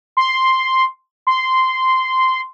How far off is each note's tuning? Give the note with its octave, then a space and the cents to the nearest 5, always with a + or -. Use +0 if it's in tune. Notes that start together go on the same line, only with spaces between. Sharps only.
C6 +0
C6 -10